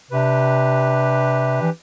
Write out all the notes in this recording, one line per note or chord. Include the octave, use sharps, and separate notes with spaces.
C3 D4 G4 B4
E3